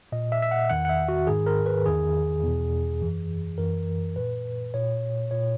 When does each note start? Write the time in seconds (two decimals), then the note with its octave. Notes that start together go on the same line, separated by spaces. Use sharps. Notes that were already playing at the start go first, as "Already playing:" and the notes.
0.12 A#2 D#5
0.32 E5
0.42 E5
0.51 F#5
0.70 E2 D#3 F#5
0.85 F#5
0.89 E5
1.08 F#4
1.27 G#2 D#3 G#4
1.46 A#4
1.66 B4
1.86 E2 D#3 G#4
2.43 E2 B2
3.01 F#2 E3
3.58 F#2 E3 A#4
4.16 A#2 B4
4.74 A#2 C#5
5.31 A#2 C#5